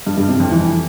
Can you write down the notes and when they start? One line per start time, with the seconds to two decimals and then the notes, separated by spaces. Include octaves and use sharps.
0.07 G2
0.18 G2
0.29 C3
0.40 F2
0.51 E3